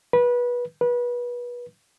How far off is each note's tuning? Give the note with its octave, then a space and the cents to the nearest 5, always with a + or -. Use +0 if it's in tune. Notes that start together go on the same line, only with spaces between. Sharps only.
B4 -20
B4 -25